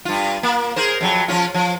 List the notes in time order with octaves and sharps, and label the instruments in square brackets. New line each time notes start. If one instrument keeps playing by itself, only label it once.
[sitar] G2 F4
A#3
G#4 A#4 C5
F2 F#3
F3 C#4 F4
F3